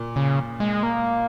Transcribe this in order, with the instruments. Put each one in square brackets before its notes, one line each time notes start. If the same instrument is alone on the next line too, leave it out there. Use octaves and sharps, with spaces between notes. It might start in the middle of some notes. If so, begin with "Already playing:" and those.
Already playing: [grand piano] A#2
[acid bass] C#3
G#3
A#3